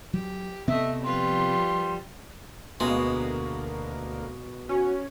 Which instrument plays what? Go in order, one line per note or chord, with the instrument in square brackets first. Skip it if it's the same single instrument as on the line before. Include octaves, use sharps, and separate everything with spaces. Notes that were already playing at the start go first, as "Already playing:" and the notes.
[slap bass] F#3 [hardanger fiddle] G4
[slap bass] C3 B3 C4 [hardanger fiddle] A3 D#5 [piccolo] E5
[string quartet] F3 G3 [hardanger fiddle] F4 B4 [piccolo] C6
[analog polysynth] D2 A#3 [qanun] B2 [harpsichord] G#3
[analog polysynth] C#4 [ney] F#4